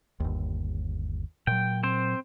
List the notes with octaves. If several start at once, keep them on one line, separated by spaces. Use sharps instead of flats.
G1 D#2
A#2 F#3 G5
C4 C5